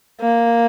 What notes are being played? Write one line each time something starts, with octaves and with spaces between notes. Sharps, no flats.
A#3